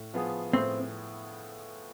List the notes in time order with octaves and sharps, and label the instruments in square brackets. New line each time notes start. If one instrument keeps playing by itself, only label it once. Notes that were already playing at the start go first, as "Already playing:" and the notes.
Already playing: [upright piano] A2
F3 B3 F4 G#4
[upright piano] A2 [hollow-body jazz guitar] C4